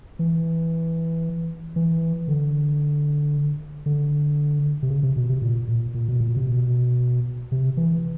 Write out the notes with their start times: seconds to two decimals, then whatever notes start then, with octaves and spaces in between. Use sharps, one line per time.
0.19 E3
1.76 E3
2.28 D3
3.86 D3
4.83 C3
4.90 C#3
5.03 C3
5.16 B2
5.30 C3
5.42 A#2
5.68 A#2
5.94 A#2
6.08 B2
6.21 A#2
6.37 C3
6.47 B2
7.52 C3
7.77 E3